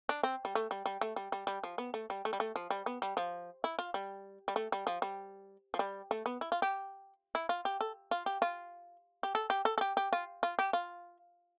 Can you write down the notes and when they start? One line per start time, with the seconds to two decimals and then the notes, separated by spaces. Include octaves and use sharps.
0.09 D4
0.23 C4
0.45 G3
0.55 A3
0.71 G3
0.86 G3
1.01 A3
1.16 G3
1.32 G3
1.47 G3
1.63 F3
1.78 B3
1.94 A3
2.10 G3
2.25 A3
2.33 G3
2.40 A3
2.56 F3
2.70 G3
2.86 B3
3.02 G3
3.17 F3
3.64 E4
3.79 F4
3.94 G3
4.48 G3
4.56 A3
4.72 G3
4.87 F3
5.02 G3
5.74 F3
5.79 G3
6.11 A3
6.26 B3
6.41 E4
6.52 F4
6.62 G4
7.35 E4
7.49 F4
7.65 G4
7.81 A4
8.11 F4
8.26 G4
8.42 F4
9.23 G4
9.35 A4
9.50 G4
9.65 A4
9.78 A4
9.81 G4
9.97 G4
10.13 F4
10.43 F4
10.59 G4
10.73 F4